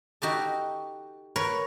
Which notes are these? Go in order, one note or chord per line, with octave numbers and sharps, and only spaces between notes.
D#4 F#4 G4 A4
A#4 B4 C#5